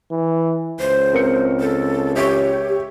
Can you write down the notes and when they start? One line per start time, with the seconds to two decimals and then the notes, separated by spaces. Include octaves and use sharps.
0.11 E3
0.79 C#2 C5
1.13 C4 A#4 C#7
1.60 A4
2.16 G4 C#5 E5 C#6